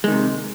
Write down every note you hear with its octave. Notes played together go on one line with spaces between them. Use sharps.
C3 D#3 G#3